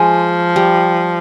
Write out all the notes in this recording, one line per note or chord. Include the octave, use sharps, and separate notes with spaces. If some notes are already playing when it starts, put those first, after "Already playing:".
Already playing: F3 G#3
G3